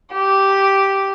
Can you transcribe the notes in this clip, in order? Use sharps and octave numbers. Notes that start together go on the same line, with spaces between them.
G4